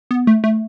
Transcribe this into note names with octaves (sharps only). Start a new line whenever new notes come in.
B3
A3
A3